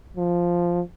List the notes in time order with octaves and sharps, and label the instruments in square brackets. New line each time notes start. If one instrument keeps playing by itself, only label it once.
[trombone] F3